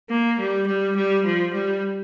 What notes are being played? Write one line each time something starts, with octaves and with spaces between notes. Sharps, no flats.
A#3
G3
G3
G3
F3
G3